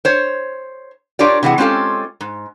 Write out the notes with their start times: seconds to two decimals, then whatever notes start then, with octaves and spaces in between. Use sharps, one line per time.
0.05 C5 C#5
1.19 D4 F4 G4 A#4 C#5 D5
1.43 C3 E3 G#3 F#5
1.58 G#3 C4 C#4 F4 G4 A4
2.21 G#2